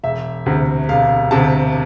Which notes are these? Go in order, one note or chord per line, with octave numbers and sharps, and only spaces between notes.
E1 E5
D2 C3
E1 F5
D2 C3 A5